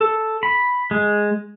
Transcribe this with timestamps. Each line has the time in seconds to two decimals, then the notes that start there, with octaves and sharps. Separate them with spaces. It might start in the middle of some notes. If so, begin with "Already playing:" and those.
0.01 A4
0.43 B5
0.91 G#3